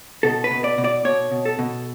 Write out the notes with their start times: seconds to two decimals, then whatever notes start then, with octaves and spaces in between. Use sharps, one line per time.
0.23 B2 A4
0.44 B4
0.51 B2
0.64 D5
0.78 B2
0.84 D5
1.05 B2 C#5
1.31 B2
1.46 A4
1.59 B2